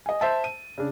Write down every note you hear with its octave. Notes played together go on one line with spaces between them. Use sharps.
D#5 G#5
C5 E5 A5
D#7
C#3 D4